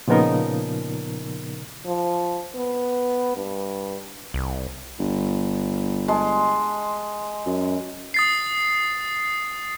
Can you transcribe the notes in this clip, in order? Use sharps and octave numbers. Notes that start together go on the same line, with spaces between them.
A#2 C#3 F3 B3 D#4 A#4
F3
B3
G2
C2
G1
G#3 A5 C6
F#2
D#6 A6 C7